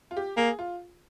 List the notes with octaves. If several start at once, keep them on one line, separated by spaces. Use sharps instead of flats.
F4
G4
A#3 G#4
F4